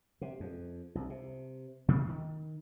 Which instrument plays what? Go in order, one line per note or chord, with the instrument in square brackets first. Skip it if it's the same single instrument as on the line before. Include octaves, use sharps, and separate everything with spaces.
[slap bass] C3
F2
C2
C3
C3 D#3 A3 A#3
D#3